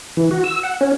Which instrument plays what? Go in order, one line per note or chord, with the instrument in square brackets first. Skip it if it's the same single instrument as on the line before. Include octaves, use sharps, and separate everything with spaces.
[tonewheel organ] E3
F#4
E6
F#5
C#4